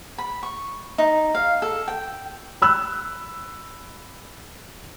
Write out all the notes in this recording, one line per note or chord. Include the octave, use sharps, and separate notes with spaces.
B5
C#6
D#4
F5
A4
G5
B5 E6 F#6